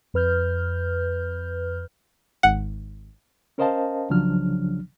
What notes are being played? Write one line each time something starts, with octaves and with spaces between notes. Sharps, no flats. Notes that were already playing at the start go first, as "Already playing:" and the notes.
F2 B4 F6 G6
G#1 F#5
C#4 A#4 C5 D#5 F5 A5
C2 C#3 F3 F#3 D4 F6